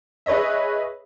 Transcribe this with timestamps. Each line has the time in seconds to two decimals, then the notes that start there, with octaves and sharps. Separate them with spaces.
0.26 G#4 B4 C#5 D#5 E5